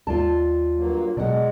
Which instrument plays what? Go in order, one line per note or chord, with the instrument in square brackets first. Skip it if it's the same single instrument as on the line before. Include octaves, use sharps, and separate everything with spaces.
[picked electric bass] D#2 [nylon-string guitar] F4 D5 A5
[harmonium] G2 F#3 A#3
[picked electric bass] B2 F#3 [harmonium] G#3 [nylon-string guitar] D5 F#5